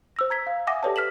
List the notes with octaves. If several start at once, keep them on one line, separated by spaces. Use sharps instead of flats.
C5 E6 A#6
A#5 G#6 B6
F5
E5 F#5 G#5 D6 D#6 A#6
G4 A4 B4 C#5 D5 A5
F6 B6 E7 F#7